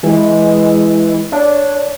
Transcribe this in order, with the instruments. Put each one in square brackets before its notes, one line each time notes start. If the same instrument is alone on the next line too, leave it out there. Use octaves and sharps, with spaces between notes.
[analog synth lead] E3 [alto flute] G#3
[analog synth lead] D4 [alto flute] C#5